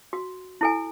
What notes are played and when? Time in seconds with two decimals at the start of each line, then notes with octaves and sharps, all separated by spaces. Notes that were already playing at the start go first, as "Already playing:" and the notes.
0.13 F#4
0.61 E4 A4 G#5